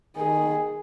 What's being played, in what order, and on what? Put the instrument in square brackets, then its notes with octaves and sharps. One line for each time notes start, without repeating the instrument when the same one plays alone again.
[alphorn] D#3 [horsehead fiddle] G#4